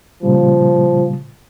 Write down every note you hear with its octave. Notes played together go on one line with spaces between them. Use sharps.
A#2 C#3 F3 G3